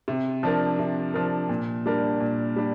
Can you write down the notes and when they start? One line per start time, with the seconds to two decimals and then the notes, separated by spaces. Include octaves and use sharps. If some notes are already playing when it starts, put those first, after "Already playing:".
0.08 C3
0.43 F3 D4 A#4
0.79 C3
1.14 F3 D4 A#4
1.49 A#2
1.86 G3 D4 A#4
2.20 A#2
2.56 G3 D4